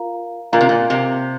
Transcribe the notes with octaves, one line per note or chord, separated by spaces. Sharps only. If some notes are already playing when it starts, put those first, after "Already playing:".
Already playing: F4 A#4 F5 A#5
A#2 F4 A#4 F5 A#5
C3
A#2
C3